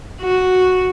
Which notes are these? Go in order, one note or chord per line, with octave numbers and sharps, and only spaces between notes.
F#4